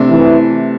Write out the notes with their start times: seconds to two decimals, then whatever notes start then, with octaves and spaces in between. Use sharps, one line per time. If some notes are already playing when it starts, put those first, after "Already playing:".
Already playing: C3 A3 D4
0.09 E3